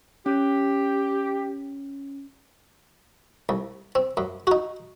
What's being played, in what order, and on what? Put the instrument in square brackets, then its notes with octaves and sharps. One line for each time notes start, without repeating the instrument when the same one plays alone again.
[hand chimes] C#4 [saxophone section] G4
[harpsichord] C2
C4
F#2
D#4 F#4